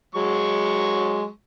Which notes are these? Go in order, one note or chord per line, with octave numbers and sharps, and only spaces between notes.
F#3 G#3 C#6